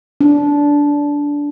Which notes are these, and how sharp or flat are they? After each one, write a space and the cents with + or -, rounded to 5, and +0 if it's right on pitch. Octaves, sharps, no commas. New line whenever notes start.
D4 -15